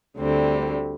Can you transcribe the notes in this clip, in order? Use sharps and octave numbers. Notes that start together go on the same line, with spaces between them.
D2 D3 G3 C4